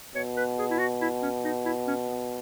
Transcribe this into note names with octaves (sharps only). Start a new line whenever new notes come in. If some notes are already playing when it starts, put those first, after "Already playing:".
B2 C#5
B4
G#4
E4
F#4
E4
C#4
D#4
E4
C#4
B3